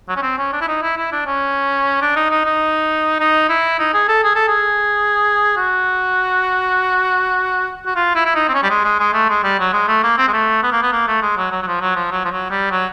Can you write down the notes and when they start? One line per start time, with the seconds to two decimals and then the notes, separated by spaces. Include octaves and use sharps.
0.09 F#3
0.17 C#4
0.22 C4
0.38 C#4
0.53 D4
0.61 E4
0.68 D#4
0.83 E4
0.97 E4
1.12 D4
1.27 C#4
2.02 D4
2.16 D#4
2.31 D#4
2.45 D#4
3.20 D#4
3.49 E4
3.79 D#4
3.94 G#4
4.09 A4
4.24 G#4
4.36 A4
4.48 G#4
5.57 F#4
7.86 F#4
7.96 F4
8.16 E4
8.26 E4
8.36 D#4
8.49 C4
8.54 C#4
8.63 G3
8.70 G#3
8.85 G#3
9.00 G#3
9.14 A3
9.29 G#3
9.44 G3
9.59 F#3
9.73 G#3
9.88 A3
10.03 A#3
10.18 C4
10.28 G#3
10.33 A3
10.63 B3
10.72 A#3
10.83 B3
10.92 A#3
11.08 A3
11.22 G#3
11.37 F#3
11.52 F#3
11.62 F#3
11.67 F3
11.81 F#3
11.96 F3
12.12 F#3
12.25 F3
12.31 F#3
12.50 G3
12.71 F#3